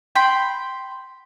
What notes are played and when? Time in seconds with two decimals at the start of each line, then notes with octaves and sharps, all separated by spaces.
0.15 G5 B5 C6